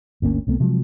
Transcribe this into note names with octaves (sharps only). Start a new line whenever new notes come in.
G1 D2 A#3 C#4
C2 C3 A3 B3
C3 F3 F#3 G#3